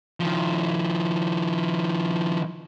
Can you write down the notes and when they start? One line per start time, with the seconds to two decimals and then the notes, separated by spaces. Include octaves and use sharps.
0.20 D#3 F3